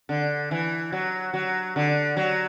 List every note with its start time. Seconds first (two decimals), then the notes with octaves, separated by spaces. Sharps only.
0.09 D3
0.51 E3
0.92 F#3
1.34 F#3
1.76 D3
2.17 F#3